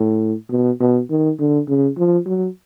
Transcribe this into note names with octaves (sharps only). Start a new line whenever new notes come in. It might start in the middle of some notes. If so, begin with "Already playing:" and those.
Already playing: A2
B2
B2
D#3
D3
C#3
F3
F#3